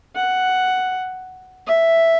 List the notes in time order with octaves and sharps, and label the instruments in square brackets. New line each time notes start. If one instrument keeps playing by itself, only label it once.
[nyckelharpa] F#5
E5